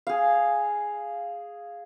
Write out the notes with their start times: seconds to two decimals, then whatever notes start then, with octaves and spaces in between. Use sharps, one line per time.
0.07 G#4 F5